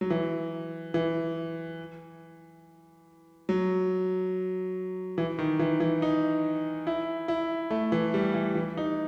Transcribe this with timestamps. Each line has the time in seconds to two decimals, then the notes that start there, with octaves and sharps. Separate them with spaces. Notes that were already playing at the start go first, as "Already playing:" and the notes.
0.01 F#3
0.10 E3
0.94 E3
3.49 F#3
5.18 E3
5.39 D#3
5.59 E3
5.80 E3
6.02 D#4
6.87 E4
7.28 E4
7.71 A3
7.92 E3
8.14 G3
8.34 E3
8.55 E3
8.77 D#4